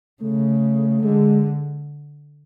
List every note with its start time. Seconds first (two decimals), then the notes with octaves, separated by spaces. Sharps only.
0.21 C#3 A3
1.03 D3 G#3